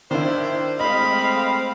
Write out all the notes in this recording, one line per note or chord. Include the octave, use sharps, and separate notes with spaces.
D#3 D4 E4 C5
G#3 A3 C4 D#5 F5 B5